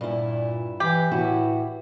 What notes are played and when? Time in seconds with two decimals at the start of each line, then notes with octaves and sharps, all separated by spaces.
0.01 G2 A#2 E4
0.80 E3 G4
1.11 A2 E3 E4 F#4